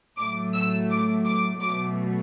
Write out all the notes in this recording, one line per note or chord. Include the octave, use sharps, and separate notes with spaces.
A2 F#3 A3 D6
E6
D6
D6
B2 F#3 A3 D6